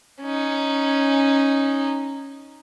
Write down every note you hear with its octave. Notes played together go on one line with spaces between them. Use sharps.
C#4 D#4